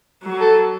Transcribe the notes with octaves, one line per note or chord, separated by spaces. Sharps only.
F#3
A4